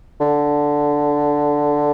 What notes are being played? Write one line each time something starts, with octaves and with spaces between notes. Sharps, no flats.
D3